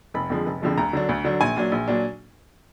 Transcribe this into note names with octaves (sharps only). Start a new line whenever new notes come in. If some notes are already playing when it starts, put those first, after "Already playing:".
F1 B5
F2 D3 F3 G#3
F1
F2 D3 F3 G#3
D2 A#5
D3 F#3 D4
D2
D3 F#3 D4
A#1 G#5
A#2 F#3 D4
A#1
A#2 F#3 D4